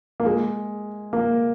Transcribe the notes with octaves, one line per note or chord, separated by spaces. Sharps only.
A#3
G#3
A#3